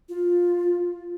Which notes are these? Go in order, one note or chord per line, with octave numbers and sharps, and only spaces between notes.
F4